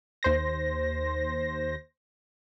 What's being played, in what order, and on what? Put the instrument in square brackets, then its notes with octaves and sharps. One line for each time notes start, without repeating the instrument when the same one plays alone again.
[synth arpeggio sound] D#2 C5 A#6